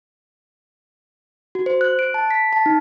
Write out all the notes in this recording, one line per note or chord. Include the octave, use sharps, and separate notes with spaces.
F#4
C5
F#6
D7
A5
B6
A5
D#4